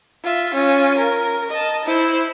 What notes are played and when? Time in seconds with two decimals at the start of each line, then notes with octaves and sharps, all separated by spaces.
0.23 F4 E5
0.54 C#4 F4
0.97 A#4
1.50 D#5 A5
1.85 E4 C5